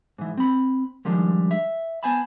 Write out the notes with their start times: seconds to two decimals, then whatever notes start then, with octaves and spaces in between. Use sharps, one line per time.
0.18 G#2 E3
0.38 C4 B5
1.05 D#3 F3 G3 G#3 D4
1.51 E5
2.03 B3 C5 G#5 A5 B5